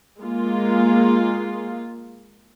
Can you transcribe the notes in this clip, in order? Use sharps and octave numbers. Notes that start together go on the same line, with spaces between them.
G#3 A#3 F4